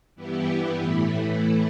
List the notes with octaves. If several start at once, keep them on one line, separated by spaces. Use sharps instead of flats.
G2 E3 B3 E4 G4
A2 E3 A3 E4